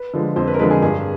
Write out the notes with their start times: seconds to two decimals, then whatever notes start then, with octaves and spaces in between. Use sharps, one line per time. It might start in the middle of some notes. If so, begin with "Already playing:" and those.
Already playing: B4
0.13 D3 F3 G#3
0.36 F2 C5
0.47 B4
0.54 A#4
0.59 D3 F3 G#3 B4
0.70 G#4
0.82 G2 G#4